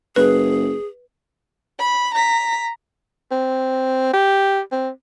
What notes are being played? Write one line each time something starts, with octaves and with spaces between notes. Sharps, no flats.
F#1 G#4 B4
B5
A#5 B6
C4
G4
C4